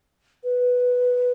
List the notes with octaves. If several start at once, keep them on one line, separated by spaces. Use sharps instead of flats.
B4